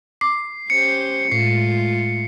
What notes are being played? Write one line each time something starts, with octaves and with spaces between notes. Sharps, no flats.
D6 C7
C#4 G4 C5 C#7
A2 G#3 A3 F4 C7